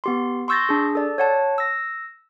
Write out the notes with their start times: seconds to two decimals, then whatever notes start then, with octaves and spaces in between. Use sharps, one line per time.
0.04 B3 G4 C6
0.48 C6 C#6 E6 G6 A6 A#6
0.69 D4 G#4
0.95 A4 D5
1.18 C#5 F#5 A5
1.58 E6 A#6